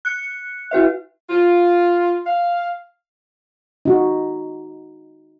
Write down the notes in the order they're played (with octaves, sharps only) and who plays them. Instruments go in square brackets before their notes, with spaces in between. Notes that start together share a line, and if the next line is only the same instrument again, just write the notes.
[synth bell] F#6 C#7
E4 F#4 B4 E5
[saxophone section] F4
F5
[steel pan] D#4 F#4